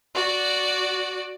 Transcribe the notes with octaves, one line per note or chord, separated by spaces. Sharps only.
F#4 D5